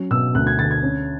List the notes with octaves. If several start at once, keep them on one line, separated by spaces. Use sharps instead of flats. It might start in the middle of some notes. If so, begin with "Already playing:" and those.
Already playing: F#3 C#4
B2 E6
D2 F#6
G#6
D3 A6
G#6
C#4